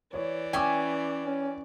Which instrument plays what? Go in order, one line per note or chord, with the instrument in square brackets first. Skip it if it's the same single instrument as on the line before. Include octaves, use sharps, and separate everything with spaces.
[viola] E3 D5 [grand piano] C#5
[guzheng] C#4 E5 G#5 [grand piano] G5 D6
[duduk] C#4